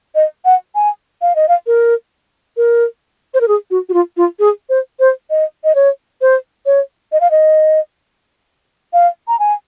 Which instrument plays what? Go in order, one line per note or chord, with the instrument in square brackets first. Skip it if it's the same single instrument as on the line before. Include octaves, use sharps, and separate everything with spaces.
[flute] D#5
F#5
G#5
F5
D#5
F5
A#4
A#4
C5
A#4
G#4
F#4
F#4
F4
F4
G#4
C5
C5
D#5
D#5
C#5
C5
C#5
D#5
F5
D#5
F5
A#5
G#5